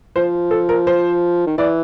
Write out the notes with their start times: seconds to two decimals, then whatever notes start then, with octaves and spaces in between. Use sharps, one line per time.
0.16 F3 C5
0.51 A4
0.69 A#4
0.87 C5
1.46 D#3
1.58 E3 D5